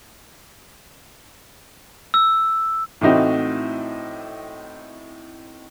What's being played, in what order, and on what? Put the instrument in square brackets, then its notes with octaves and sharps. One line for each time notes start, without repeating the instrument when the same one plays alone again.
[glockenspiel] E6
[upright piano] A2 E3 A3 C4 D#4 F#4